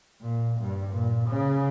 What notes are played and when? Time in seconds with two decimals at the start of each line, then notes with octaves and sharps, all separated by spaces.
0.21 A#2
0.59 G2
0.92 A#2
1.29 C#3